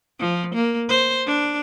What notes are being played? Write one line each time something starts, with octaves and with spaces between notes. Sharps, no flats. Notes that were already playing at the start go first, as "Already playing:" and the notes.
F3
A#3
C5
D4